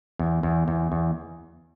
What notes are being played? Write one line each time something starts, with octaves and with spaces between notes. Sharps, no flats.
E2
E2
E2
E2